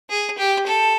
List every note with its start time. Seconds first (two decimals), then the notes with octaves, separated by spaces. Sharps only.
0.10 G#4
0.38 G4
0.66 A4